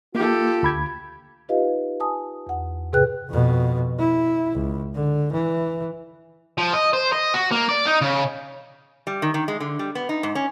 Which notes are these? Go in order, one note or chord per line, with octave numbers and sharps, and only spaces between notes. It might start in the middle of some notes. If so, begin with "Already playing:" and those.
A#3 F4 G4 A4
D2 B5 G#6
D#4 F4 G4 B4 D#5 F5
G#5 A5 D#6
E2 F#5
G#2 C3 G#4 B4 G5 F#6
F2 B2
E4
C#2
D3
E3
F3
D#5
C5
D#5
F#4
A#3
D5
D#4
C#3
G3
D#3
D#3
G#3
D3
G3
B3
D#4
G#2
C#4